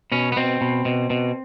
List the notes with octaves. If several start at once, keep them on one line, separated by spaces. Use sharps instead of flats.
B2 C#4
B3
B2 C4
B2
B2
B2